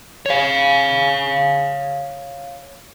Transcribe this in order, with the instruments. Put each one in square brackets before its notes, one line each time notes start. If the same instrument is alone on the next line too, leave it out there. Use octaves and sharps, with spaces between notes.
[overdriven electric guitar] C#5 F5